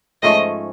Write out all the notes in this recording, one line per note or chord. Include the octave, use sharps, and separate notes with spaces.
G#2 F3 A3 C#4 D#5